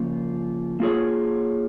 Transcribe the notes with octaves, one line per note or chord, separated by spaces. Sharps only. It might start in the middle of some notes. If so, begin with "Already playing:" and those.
Already playing: C#3 F3 A#3 F4
A#3 F4 G#4 C#5